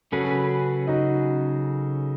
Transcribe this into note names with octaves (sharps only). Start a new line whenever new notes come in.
C#3 F#3 C#4 F#4 G#4 A4 B4
D#4 F#4